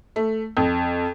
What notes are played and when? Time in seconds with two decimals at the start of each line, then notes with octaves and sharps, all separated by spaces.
0.16 A3
0.57 F2